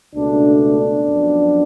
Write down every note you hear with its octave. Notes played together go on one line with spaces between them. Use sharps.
C#2 B2 A3 D4
D4
F#2 F3 B3